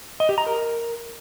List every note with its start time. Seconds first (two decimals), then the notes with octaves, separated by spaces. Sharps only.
0.20 D#5
0.29 G4
0.38 A#5
0.47 A#4